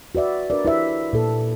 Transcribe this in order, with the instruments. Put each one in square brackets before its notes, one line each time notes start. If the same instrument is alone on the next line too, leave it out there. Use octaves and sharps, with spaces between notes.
[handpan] F#4 B4 D5 E5
D4 A#4 B4 D5
E4 G4 B4 C5 D5 E5
A#2 A4